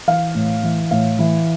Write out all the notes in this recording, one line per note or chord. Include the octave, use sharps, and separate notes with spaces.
E3 F5
A2
E3
A2 F5
E3